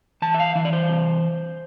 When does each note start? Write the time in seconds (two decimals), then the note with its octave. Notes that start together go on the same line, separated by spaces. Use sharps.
0.22 E3 A5
0.34 E5
0.40 F5
0.55 E3 E5
0.65 D5
0.73 C5
0.89 C3